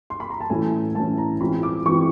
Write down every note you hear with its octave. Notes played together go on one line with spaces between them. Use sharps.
C6
B5
A#5
A5
A2 E3 A3 C#4 G#5
A2 E3 A3 C#4 A5
A#5
E3 G#3 C4 F4 B5
D6
E3 G#3 C4 F4 C#6